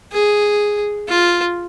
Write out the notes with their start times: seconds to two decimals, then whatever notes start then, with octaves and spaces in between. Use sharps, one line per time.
0.12 G#4
1.09 F4